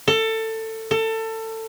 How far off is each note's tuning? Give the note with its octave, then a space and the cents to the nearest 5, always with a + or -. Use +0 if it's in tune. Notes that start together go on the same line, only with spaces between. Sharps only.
A4 +20
A4 +25